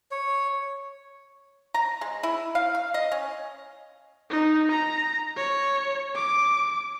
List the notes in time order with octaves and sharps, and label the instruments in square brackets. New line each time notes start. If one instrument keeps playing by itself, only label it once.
[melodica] C#5
[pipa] A#5
G#3
E4
F5
F5
D#5
C#4
[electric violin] D#4
A#5
C#5
D6